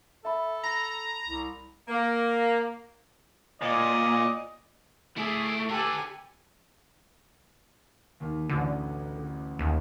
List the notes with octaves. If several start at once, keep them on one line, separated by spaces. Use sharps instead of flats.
A4 E5 B5
A#5 B5 A#6
C2
A#3
A#2 D5 D#5
A3 E4 G#4 D5
D3 G4 A4 B4 G#5
D#2 D#3
A1 D2 D3
D#2